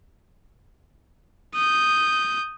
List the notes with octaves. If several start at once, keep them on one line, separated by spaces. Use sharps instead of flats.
D#6 G6